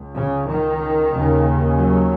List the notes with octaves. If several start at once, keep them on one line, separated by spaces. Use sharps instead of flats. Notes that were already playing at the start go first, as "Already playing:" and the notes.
Already playing: C#2
C#3
D#3
D#2 C#3
F#3